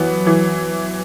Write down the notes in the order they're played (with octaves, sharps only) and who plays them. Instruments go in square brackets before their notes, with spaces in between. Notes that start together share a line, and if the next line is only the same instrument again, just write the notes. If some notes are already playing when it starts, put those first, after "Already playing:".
Already playing: [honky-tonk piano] E3 B3 [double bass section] F#3
[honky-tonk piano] E3